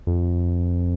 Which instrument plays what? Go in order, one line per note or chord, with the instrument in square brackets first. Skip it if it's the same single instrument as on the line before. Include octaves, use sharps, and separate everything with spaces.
[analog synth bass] F2